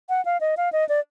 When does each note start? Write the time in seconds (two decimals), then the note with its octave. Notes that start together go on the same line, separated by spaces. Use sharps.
0.09 F#5
0.25 F5
0.41 D#5
0.57 F5
0.73 D#5
0.89 D5